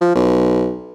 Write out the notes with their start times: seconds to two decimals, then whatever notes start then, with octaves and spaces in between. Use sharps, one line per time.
0.01 F3
0.15 B1